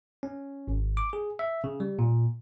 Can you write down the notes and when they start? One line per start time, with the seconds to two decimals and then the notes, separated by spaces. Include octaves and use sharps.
0.23 C#4
0.68 G#1
0.97 D6
1.13 G#4
1.39 E5
1.64 C#3
1.80 G3
1.99 A#2